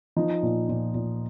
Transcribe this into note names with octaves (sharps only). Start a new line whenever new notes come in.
F3 D#4
A#2
A#2
A#2